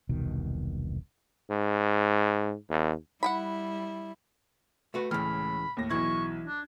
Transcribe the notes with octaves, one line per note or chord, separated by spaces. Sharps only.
E1 C2 B2 D#3
G#2
D#2
G3 E4 F#5 G5 B5
A3 F#4 B4
C#2 A2 E3 B5 F6
D#2 A2 A#6
B1 E3 E4 C#6 G#6
D4